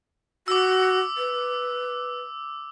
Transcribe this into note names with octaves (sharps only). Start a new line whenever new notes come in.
F#4 D6 E6
B4